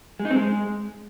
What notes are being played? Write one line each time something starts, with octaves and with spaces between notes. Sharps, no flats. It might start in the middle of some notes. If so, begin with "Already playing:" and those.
G#3
D#4
C4
G#3